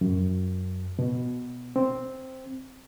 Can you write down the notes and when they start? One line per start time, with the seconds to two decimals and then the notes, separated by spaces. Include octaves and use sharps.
0.01 F#2
0.99 B2
1.76 C4